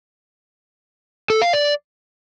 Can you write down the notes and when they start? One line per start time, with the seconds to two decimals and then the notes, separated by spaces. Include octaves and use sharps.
1.30 A4
1.42 F5
1.53 D5